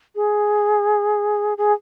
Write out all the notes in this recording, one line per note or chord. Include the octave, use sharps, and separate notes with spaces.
G#4
G#4